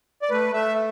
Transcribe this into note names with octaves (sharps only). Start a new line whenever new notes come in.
D5
A3 B4
A3 E5